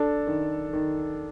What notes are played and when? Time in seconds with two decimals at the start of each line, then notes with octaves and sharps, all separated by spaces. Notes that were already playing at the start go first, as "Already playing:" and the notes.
Already playing: D4 A4
0.27 D#3
0.73 D#3